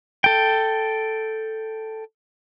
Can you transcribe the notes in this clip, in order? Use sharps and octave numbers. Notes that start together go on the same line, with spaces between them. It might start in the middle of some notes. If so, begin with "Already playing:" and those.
A4 G5